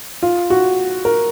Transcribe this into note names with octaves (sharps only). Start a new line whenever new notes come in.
F4
F#4
A#4